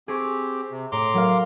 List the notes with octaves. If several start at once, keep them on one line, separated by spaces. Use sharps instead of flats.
C4 G4 G#4 C#6 D7
C3
A2 A#5 C6 D6
F#3 A#4 F5